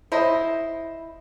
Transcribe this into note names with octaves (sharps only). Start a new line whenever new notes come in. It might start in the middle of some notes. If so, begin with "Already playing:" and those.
E4 C5 D#5